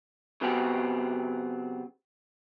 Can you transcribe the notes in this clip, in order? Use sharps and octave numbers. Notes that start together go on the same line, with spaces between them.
C#3 F#3 B3 C4 G4 G#4